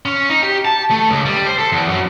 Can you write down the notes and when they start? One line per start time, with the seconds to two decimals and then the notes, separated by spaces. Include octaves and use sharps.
0.06 C#4
0.29 D#4
0.43 G4
0.65 A5
0.91 A3
1.09 C#2
1.25 G3
1.47 C5
1.58 A4
1.72 E2
1.88 F#2